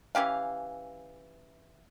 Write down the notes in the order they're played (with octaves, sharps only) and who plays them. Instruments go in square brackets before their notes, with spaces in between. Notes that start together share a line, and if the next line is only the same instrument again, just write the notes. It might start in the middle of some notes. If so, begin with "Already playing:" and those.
[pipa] E3 C#4 G4 F5